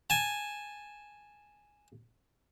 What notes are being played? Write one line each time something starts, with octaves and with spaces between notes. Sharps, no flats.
G#5 A5